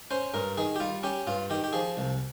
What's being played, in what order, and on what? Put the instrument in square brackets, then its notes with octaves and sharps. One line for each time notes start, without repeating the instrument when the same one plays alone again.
[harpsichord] C#4 C5
G2 A#4
D#3 G#4
G4
G3 F4
C#4 G4
G2 F4
D#3 G4
G4
F3 G#4
C2